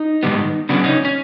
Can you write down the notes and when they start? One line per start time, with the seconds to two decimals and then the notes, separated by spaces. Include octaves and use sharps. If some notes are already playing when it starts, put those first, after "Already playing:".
Already playing: D#4
0.23 G#2 D#3 G3 B3
0.69 C#3 F#3 B3 D4
0.84 C#4 D#4
1.05 C#4